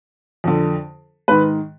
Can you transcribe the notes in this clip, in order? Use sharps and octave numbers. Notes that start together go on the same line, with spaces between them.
F2 D3
G#2 D#3 B4